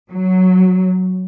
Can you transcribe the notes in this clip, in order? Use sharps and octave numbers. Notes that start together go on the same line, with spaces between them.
F#3